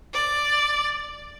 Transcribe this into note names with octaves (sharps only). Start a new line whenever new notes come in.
D5